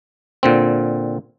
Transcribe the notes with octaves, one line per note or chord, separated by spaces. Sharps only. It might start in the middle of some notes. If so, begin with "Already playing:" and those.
A#2 D3 C4